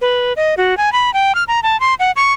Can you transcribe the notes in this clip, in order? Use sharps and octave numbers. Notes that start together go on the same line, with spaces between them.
B4
D#5
F#4
G#5
B5
G5
F6
A#5
A5
C6
F#5
C#6